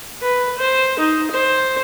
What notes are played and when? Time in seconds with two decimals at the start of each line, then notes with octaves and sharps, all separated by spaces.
0.22 B4
0.58 C5
0.99 D#4
1.31 C5